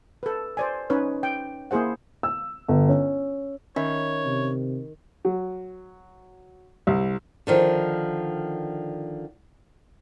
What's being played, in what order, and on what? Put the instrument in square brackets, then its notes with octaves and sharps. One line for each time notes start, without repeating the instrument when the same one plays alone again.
[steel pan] A4 B4
C5 D5 G#5
C#4 D#4 B4 C#5
G5
A#3 E4 G#4 C5 F#5
[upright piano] E6
G1
C#4
[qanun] D#3 [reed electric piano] C#4 E5 B5 [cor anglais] C#5
[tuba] C3
[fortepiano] F#3
C2
[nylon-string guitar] D3 D#3 F3